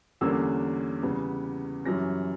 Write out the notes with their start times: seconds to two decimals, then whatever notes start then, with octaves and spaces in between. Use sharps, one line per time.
0.21 E2 D3 G3 A#3 C#4 E6
1.03 E2 C#3 G3 B3
1.85 F#2 E3 G3 C#4 A#6